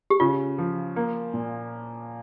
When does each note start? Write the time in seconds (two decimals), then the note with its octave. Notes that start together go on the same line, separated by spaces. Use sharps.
0.10 G4
0.20 C#3 F4
0.58 F3
0.96 A#3
1.34 A#2